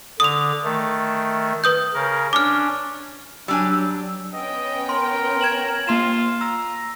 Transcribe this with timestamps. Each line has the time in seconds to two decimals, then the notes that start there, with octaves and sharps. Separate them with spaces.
0.20 D3 D#6 F7
0.64 D#3 A3
1.64 B4 D#6 G6
1.94 C#3 A#4
2.33 C#4 D4 D6 F6
3.48 F#3 G3 D4 G#5 E6
4.33 B3 C#4 D#5 G5
4.89 A#4 C6
5.41 G#6 E7 F#7
5.87 A#3 F4 C6 E7
6.41 A#5 E6